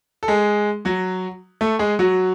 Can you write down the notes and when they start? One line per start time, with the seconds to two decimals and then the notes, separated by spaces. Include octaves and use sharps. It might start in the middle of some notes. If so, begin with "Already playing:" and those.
0.23 A4
0.28 G#3 G#4
0.85 F#3 F#4
1.61 A3 A4
1.79 G#3 G#4
1.99 F#3 F#4